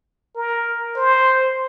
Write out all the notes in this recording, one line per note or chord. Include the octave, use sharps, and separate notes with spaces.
A#4
C5